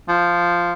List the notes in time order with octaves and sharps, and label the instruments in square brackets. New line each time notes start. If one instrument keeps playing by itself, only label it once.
[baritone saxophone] F3